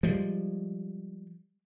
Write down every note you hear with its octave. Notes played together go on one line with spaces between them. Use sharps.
F3 G3 G#3